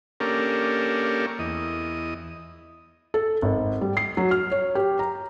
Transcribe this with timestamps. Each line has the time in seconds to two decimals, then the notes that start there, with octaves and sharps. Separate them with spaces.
0.20 A#3 C#4 D4 G4 A4 A#4
1.39 E2 D#5
3.14 A4
3.42 G#1
3.81 G3
3.97 C7
4.17 F#3
4.31 F6
4.52 C#5
4.75 G4
4.99 A#5